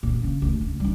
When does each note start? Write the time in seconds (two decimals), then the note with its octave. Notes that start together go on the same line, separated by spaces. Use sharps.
0.03 A#2 D3
0.24 C#3
0.42 D2 G#2
0.61 F#1 D2
0.80 G3 D#4